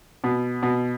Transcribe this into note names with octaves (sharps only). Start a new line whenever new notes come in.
B2
B2